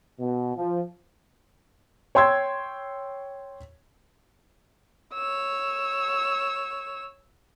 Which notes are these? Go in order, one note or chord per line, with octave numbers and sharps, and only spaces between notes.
B2
F3
C#5 G5 C6 E6 G#6
C#5 E6